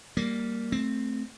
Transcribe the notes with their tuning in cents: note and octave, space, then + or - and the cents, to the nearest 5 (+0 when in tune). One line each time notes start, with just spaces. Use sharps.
G3 +0 A#3 -5
A3 +0 C4 +0